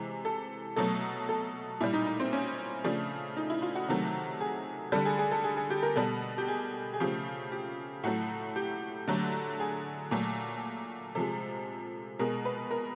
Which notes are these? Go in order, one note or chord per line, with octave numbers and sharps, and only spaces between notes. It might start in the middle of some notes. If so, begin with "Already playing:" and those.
Already playing: C3 E3 G#3
A4
B2 F#3 A3 A4
A4
A#2 G3 E4
D#4
D#4
C4
C#4
C#3 F3 A3 D4
D#4
E4
F4
F#4
C3 D#3 F#3 A3
G#4
D3 G3 A4
G#4
G#4
A4
G#4
G#4
G4
A#4
B2 G3 A4
G4
G#4
G#4
C#3 F3 A3 G4
G4
A2 F#3 A3 F#4
G4
D3 F#3 A3
G#4
A#2 F#3 A3
C3 F3 G#3 A4
B2 G#3 A#4
B4
A#4